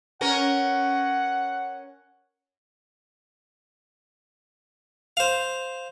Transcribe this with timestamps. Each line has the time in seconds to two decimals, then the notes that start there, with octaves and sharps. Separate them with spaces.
0.21 C#4 A#4 F#5
5.17 C5 F5